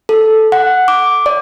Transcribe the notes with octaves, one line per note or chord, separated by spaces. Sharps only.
A4
F#5
D6
D5